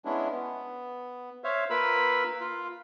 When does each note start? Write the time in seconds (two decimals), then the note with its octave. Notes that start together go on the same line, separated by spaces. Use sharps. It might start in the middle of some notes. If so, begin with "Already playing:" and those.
0.05 G#3 B3 C#4 D4 E4
0.31 B3
1.44 C5 C#5 E5 F5
1.70 A#3 F4 A#4 B4 B5 E6
2.41 F4